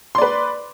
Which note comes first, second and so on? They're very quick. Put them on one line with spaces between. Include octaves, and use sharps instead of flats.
C6 D5 B4